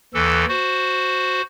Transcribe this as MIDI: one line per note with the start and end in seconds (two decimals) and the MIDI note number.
0.14 0.45 39
0.14 0.45 52
0.14 0.45 69
0.49 1.42 66
0.49 1.42 72